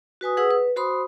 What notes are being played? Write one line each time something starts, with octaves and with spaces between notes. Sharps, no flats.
F#4 B4 G#5 D#6
G#4 B4 F#5 D#6 E6
B4
F#4 C5 B5 C6 D#6